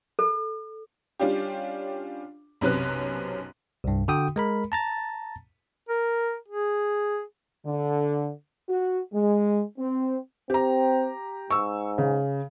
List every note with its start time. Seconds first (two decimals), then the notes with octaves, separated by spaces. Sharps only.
0.19 A4
1.20 G3 C#4 D4 F4 G4
2.61 B1 F#2 C3 C#4 B4 F#6
3.84 C2 G2
4.08 D3 F#4 G5 D#6
4.36 G#3 A#4 B5
4.72 A5 A#5 A6
5.89 A#4
6.49 G#4
7.65 D3
8.68 F#4
9.13 G#3
9.78 C4
10.50 C4 G4 A#5
11.51 G#2 C#6 E6
11.98 C#3